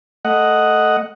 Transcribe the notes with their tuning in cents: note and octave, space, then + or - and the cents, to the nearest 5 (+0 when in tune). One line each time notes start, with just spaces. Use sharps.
A3 +0 D#5 +0 F#5 +0